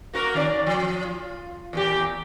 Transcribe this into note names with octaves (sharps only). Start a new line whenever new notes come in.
A#3 F#4 A#4
D#3 C#4 D5
F3
F4
E2 A#2 G4